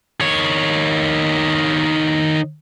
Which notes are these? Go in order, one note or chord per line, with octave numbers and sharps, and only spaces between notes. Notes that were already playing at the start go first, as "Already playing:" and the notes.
D#3 C#5